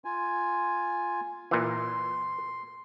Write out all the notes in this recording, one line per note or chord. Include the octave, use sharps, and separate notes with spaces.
F4 G#5
A#2 E3 C6